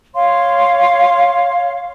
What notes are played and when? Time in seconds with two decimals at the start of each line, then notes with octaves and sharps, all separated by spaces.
0.15 C#5 F5 C6